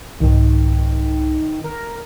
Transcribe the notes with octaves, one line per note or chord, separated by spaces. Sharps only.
C2 G#2 D#3
A#4